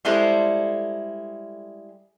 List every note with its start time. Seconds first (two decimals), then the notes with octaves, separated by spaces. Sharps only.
0.05 G3 G#3 E4 A4 C5